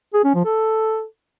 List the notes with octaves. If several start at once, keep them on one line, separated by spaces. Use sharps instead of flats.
G#4
C#4
F3
A4